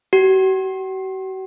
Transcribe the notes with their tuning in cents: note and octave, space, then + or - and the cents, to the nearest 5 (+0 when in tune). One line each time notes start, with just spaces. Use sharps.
F#4 +45